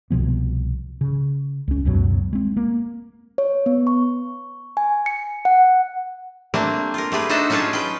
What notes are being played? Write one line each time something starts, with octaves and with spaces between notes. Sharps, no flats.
C2 B2 F3 B3
C#3
C#2 C#4
C#2 F#2 B2 F#3
G#3 C4
A#3
C#5
B3
C#6
G#5
C#7
F#5
G3 A3 A#3 C4 D4
F4 A#4
A3 G4 G#4 B4
D4 D#4 F#4 A4 C5 E5
F#3 C#4 F4 G#4 C#5 A5
B4 G5